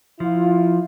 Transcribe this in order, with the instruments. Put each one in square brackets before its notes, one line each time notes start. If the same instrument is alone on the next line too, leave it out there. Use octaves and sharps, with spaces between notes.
[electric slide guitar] F3 [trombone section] E4 F4